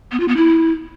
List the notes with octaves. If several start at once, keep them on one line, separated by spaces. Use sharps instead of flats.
B3
F4
B3
E4